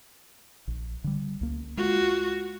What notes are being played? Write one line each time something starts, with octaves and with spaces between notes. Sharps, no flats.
A#1
D3 G3
C#2 A#3
G#3 F4 F#4